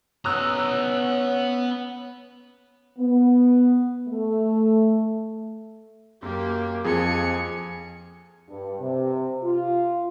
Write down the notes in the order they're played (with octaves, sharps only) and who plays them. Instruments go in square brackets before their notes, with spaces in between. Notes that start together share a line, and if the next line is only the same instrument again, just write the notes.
[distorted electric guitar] B3 A#5 [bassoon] C#4 [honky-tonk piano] D#6 E6 F#6
[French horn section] B3
A3
[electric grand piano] F#2 [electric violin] A#3 G4
[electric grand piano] F2 F3 G#4 [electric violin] G#5 C#7
[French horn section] G2
C3
F4